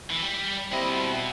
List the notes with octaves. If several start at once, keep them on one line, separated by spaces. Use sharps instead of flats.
E3
G3
D#2 G3 C4 E4 D#5
B2